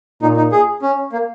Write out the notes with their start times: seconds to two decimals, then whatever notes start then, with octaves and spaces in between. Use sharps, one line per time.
0.22 A#2 D#4
0.37 D#4
0.52 G#4
0.82 C#4
1.12 A#3